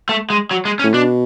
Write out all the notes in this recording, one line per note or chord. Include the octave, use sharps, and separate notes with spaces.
A3
G#3
F#3
G#3
C#4
A2
B2 D4